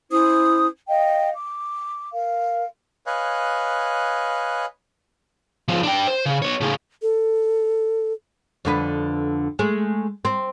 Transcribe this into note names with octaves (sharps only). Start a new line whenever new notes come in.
C#4 E4 C5 D#6
D#5 F5 G5
D6
A#4 F5
B4 C#5 D#5 F5 G#5 F#6
C#2 F3
D4 G5
C5
C#3
B3 C#5
A2 C#3
A4
F2 D3 B4
G#3 A3
C4